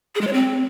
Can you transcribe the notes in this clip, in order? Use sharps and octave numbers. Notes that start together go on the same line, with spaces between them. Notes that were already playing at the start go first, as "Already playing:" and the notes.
G#4
G#3
C#5
C4